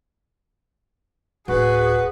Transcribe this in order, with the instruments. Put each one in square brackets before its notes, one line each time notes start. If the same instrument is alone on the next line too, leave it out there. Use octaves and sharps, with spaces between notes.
[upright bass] D1 [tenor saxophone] F#4 [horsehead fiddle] G#4 [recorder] B4